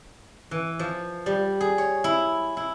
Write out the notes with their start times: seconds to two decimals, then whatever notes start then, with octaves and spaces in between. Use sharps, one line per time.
0.51 E3
0.79 F3
1.26 G3
1.61 G#4
1.78 C#5
2.04 E4
2.57 E4